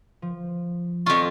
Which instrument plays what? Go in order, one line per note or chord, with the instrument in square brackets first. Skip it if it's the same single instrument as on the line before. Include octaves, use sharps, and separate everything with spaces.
[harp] F3
[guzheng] F2 F4 [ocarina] C#6